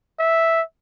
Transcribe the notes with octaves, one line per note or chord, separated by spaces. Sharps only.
E5